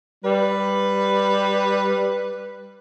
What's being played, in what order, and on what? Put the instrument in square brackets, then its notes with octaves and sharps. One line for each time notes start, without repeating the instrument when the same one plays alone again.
[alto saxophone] G3 [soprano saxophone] B4